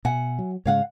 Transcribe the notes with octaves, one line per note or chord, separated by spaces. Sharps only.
B2 E5 F#5 G#5
F#3
G#2 C#3 G#3 C#5 F5 F#5